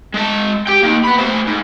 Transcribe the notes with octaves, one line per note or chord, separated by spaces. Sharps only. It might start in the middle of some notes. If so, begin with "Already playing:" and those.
G#3 A5
G4 G5
A#3 D#4
B3 B5
A3 C5
G#2